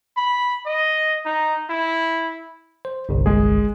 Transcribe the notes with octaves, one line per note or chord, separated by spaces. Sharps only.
B5
D#5
D#4
E4
C5
G1 C2
G#3 G#4